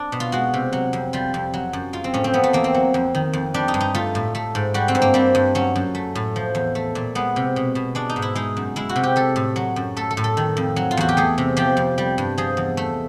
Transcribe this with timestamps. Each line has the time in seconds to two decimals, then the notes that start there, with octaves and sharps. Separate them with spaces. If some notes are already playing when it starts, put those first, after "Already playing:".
Already playing: D4
0.12 B2
0.20 F4
0.32 G#3 F#4
0.54 C3
0.73 F#3
0.93 F2
1.13 G3 F4
1.34 F2
1.54 F#3
1.73 F#2
1.93 G#3 F4
2.04 C4
2.14 A2 C#4
2.24 C4
2.33 F3 B3
2.43 A3
2.53 E2 A#3
2.64 C4
2.74 F#3
2.94 F2
3.15 D#3
3.33 F2
3.54 G3 D4
3.68 D#4
3.74 G2
3.81 D#4
3.95 A3 F4
4.15 A2
4.35 A3
4.55 G#2
4.74 G3 F#4
4.88 C4
4.95 G2
5.02 A#3
5.14 G3 C4
5.35 G2
5.55 F#3 C#4
5.76 F#2
5.95 A3
6.15 A2
6.36 F3
6.55 E2
6.75 A3
6.95 A#2
7.15 G#3 B3
7.36 C3
7.56 B2
7.75 B2
7.95 G#3 D4
8.09 D#4
8.16 G#2
8.22 E4
8.35 G#3 D#4
8.57 F#2
8.76 G#3 E4
8.89 F#4
8.96 C3
9.03 G4
9.16 A3 A4
9.36 A2
9.56 F#3
9.76 F#2
9.96 A3 A4
10.11 A4
10.17 A2
10.24 A4
10.37 D#3
10.57 F2
10.76 F#3
10.91 F4
10.97 E2 F#4
11.09 G4
11.17 A3 G#4
11.38 C3
11.57 F3 G4
11.77 F2
11.98 G3
12.18 G2
12.38 F3 G#4
12.57 E2
12.77 A3